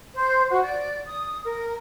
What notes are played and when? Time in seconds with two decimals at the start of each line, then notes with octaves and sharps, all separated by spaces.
0.15 C5
0.50 F#4
0.64 D5
1.07 D#6
1.44 A#4